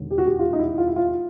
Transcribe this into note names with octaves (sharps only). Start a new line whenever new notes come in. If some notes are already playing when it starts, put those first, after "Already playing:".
Already playing: E1 D#2 D3
G4
F#4
G4
F4
D#4
E4
F4
E4
F4